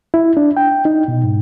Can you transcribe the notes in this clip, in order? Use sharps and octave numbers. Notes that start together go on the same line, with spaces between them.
E4
D4
G5
D#4
B2
G#2